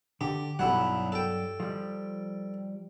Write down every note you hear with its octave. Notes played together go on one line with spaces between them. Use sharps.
D3 G4
B1 G2 F#3 G3 E4 F#5
A4 G5
F3 G3